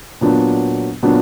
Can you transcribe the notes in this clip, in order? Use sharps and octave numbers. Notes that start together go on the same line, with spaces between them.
A#2 F#3 B3 D4
A#2 F#3 B3 D4